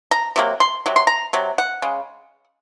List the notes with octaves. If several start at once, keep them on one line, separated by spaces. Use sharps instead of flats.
A#5
C3 F#3 A#3
C6
C3 F#3
C6
A#5
C3 F#3
F#5
C#3 G#3